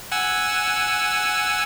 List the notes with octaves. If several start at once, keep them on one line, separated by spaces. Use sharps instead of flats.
F#5 G#5 E6